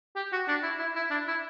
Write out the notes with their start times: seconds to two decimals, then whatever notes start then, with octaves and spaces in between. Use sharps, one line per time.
0.16 G4
0.32 F#4
0.48 D4
0.63 E4
0.79 E4
0.96 E4
1.11 D4
1.27 E4